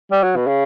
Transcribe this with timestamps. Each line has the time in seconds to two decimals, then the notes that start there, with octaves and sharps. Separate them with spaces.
0.12 G3
0.23 F#3
0.36 B2
0.47 C#3